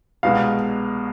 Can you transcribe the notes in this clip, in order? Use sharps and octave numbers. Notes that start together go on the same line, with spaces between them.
C2 B2 G#3 F5